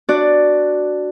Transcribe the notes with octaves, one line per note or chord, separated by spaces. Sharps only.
D4 F#4 D5